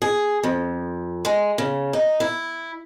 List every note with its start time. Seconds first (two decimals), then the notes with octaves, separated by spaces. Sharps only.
0.02 G#4
0.43 F2
1.25 G#3
1.58 C#3
1.93 D#4
2.20 E4